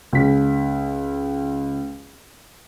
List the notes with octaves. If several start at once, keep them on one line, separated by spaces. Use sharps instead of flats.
C#2 B6